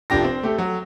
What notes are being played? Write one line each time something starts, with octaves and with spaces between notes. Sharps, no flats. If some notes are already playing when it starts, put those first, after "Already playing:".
F1 F3 D4 G4 A#6
C4
A3 G4 A4
F#3